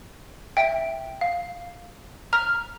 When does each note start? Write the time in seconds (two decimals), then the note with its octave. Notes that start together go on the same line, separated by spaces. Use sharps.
0.57 E5 G5
1.21 F5
2.33 A#5 F6